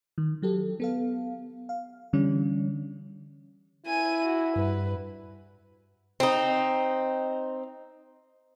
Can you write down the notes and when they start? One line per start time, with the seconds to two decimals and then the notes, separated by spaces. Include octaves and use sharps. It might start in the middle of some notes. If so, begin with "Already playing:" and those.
0.18 D#3
0.42 F#3 G4 A4
0.80 B3 A4 F5
1.69 F5
2.13 D3 E3 G3 C#4 D4
3.86 E4 G#5 D#7
4.25 F#4
4.56 G2 B4
6.20 C4 D#4